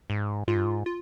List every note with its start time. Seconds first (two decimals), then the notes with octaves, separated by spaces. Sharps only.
0.10 G#2
0.48 G#2 F4
0.56 G2
0.65 G#2
0.86 F4